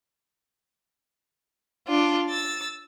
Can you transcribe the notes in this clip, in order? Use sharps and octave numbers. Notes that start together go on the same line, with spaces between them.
D4 F4
E6 A6